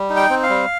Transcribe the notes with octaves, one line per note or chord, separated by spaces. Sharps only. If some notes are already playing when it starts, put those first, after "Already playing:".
Already playing: G3
D#4
G5
C4
F5
G3